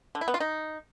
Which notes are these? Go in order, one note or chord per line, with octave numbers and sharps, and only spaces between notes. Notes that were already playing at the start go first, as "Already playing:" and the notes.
D3
E4
B3
F4
D#4